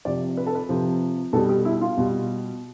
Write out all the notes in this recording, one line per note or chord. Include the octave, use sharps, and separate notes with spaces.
C3 F3 D5
B4
A4
B4
C3 F3
B2 G3 A4
G4
E4
F4
B2 G3